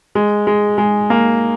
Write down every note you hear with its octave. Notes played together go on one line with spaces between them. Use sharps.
G#3
G#3
G#3
A#3